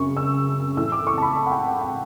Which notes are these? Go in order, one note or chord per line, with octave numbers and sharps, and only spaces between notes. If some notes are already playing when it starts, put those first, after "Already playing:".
Already playing: F#2 C#3 C#6
E6
A2 E3 E6
D6
C#6
A5
B5
A5
F#5
G5
F#5
F#5